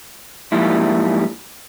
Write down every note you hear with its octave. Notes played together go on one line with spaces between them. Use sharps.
G#2 F3 G3 A#3 E4